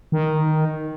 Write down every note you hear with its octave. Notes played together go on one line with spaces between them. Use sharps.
D#3